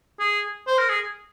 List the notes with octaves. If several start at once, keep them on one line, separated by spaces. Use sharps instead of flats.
G#4
C5
A#4
G#4